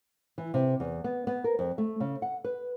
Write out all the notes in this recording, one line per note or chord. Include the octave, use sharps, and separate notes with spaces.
E3
C3
E2
B3
B3
A#4
F2
A3
C#3
F#5
B4